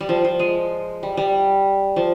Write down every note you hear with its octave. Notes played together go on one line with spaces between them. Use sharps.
G3
F3
F3
G#3
G3
G3
F3